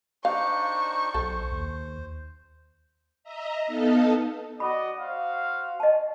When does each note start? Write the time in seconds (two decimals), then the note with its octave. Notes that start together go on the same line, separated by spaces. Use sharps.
0.25 D4 D#4 C5 F5 C#6
1.14 B1 A4 C5
1.51 D#2
3.24 D#5 E5 A#5
3.67 B3 D#4 A4 D#5 F5 A5
4.60 F#4 D5 D#5 B5
4.99 F#4 C5 F5
5.80 D#5 A5